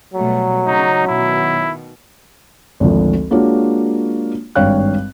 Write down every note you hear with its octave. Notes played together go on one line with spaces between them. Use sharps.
B2 F#3 G3 A3
C#3 C#4 D#4
B2 D#3 E4
G#1 D2 F3
G#3 A#3 D4 F4 F#4 C#5
G#1 G2 C#5 F5 G5 F#6